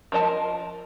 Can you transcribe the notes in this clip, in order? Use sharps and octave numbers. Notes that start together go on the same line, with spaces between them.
F3 A#4 D#5 A5